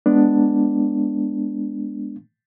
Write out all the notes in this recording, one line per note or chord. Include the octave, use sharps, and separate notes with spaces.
G#3 B3 D4